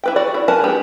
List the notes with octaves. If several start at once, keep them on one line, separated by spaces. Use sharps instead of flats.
E4 B4 G5
F#4 D5
E4
A#4 B4 F#5 G#5 A5
G#3 D4 G4 G5